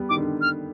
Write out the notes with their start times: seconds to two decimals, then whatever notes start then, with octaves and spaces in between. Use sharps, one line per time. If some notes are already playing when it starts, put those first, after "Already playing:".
Already playing: G3 B3
0.09 D#3 D6
0.17 D3
0.41 F6